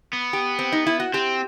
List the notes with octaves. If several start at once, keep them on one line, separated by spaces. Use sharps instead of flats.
B3
G4
C4
D#4
E4
F#4
C4 G4